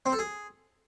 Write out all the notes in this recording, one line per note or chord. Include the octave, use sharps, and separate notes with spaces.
C4
A4
G#4